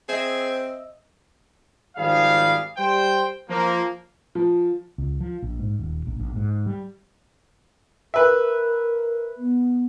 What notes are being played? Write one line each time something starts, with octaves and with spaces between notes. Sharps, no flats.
C4 G#4 D#5 E5
G#1 D#3 F3 G3 G#4 F5
G3 C5 G5
F3 A#3
F3
C#2
F3
A#1
G#2
D#1
A#1
A#1
G#2
G3
A#4 B4 E5
B3